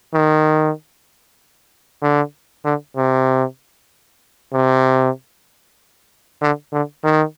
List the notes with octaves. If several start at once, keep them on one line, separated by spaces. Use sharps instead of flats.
D#3
D3
D3
C3
C3
D3
D3
D#3